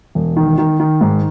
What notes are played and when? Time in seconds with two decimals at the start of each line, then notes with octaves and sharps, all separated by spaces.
0.15 E1
0.36 D#3
0.58 D#3
0.80 D#3
1.01 G#2